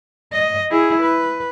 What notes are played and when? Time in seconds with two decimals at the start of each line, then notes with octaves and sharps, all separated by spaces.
0.32 D#5
0.70 E4 G#4
1.02 B4